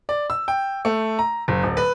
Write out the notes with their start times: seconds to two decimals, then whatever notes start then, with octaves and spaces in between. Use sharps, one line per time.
0.09 D5
0.30 E6
0.48 G5
0.85 A3
1.19 A#5
1.48 F#1
1.63 D1
1.77 B4